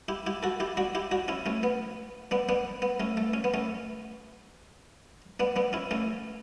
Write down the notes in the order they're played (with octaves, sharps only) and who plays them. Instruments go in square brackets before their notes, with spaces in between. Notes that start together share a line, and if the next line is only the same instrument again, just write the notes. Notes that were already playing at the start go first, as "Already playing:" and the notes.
[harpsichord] E4 G4
E4 G4
F#4 A4
E4 G4
D4 F#4
E4 G4
D4 F#4
C#4 E4
A3 C#4
B3
B3 D4
B3 D4
B3
A3 C#4
A3
C#4
B3
A3 C#4
B3 D4
B3 D4
C#4 E4
A3 C#4